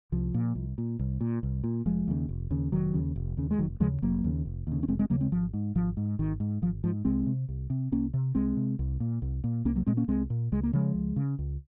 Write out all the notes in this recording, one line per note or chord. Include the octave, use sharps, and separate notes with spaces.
C2 F3
A#2
C2
A#2
C2
A#2
C2
A#2
F1 F3 G#3
D#2 C#3
F1
D#2 C#3
F1 D#3 F#3
D#2 C#3
F1
D#2 C#3
G#3
F1 D#3 F#3
D#2 C#3 F3 G#3
F1 F#3 A#3
D#2 C#3
F1
D#2 C#3
C#4
F1 G#3 C4
G#3 C4
D#2 C#3 F#3 A#3
G#3 C4
G#1 F3
G#2
G#1 F3
G#2
G#1 D#3
G#2
G#1 F3
G#2 F3
C2 G#3 C4
C3
C2
C3
C2 A#3 C#4
C3
C2 G#3 C4
C3
C2
A#2
C2
A#2
C2 A#3 C#4
F#3 A#3
A#2 G#3 C4
A#3 C#4
C2 G#3 C4
A#2
C#2 G#3
A#3
C#3 F3 G#3
C#2
C#3
C#2